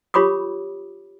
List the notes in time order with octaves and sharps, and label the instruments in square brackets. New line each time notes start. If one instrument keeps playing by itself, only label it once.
[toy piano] F4 G4 C#5 B5 D6 D#6